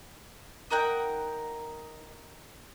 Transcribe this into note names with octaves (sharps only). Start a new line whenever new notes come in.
D#4 A#4 F#5 G5